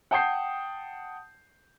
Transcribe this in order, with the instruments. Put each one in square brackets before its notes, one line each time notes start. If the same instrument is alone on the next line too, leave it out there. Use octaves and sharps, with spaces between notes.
[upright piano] F#5 G5 A5 D#6 G6 C7